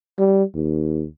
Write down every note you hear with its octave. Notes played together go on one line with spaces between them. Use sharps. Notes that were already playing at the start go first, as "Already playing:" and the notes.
G3
D#2